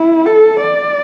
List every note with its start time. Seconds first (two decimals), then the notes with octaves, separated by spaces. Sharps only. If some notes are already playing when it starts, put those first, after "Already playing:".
Already playing: E4
0.26 A4
0.61 D5